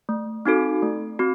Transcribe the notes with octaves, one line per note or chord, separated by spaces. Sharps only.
A3
C4 D#4 F#4 A4
A3
C4 F#4